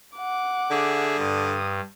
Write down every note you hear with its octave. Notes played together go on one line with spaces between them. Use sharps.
F#5 D6
D3 G#4 E5
G2 D#6